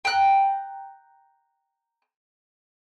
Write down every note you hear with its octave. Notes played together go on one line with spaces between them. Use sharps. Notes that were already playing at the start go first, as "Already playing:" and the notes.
G5 A#5 F#6